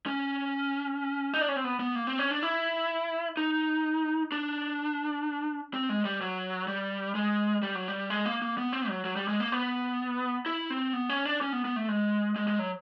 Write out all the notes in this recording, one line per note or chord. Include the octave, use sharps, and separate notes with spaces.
C#4
D#4
D4
C#4
C4
B3
B3
A#3
C4
C#4
D4
E4
D#4
D4
C4
G#3
G3
F#3
G3
G#3
G3
F#3
G3
G#3
A#3
A#3
B3
C4
F#3
F#3
G3
G#3
A#3
B3
E4
C4
B3
C#4
D4
C#4
B3
B3
A3
G#3
G#3
G#3
F#3